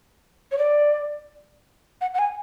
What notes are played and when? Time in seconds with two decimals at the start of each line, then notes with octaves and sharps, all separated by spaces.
0.51 C#5
0.58 D5
2.01 F#5
2.14 F#5
2.19 G#5